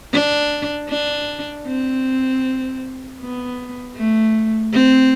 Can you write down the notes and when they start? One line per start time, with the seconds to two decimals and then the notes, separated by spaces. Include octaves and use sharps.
0.13 D4
0.89 D4
1.67 C4
3.20 B3
3.96 A3
4.73 C4